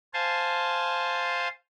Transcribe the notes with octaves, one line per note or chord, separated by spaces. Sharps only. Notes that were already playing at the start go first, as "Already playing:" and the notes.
C5 F5 G#5 A5